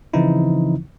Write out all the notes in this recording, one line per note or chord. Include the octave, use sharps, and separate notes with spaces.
C#3 E3 F3 C4 D#4 E4